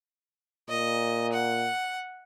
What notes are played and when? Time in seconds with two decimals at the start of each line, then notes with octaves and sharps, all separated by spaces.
0.69 A#2 D#5
1.32 F#5